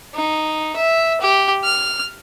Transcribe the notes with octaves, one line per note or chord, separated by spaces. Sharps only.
D#4
E5
G4
F6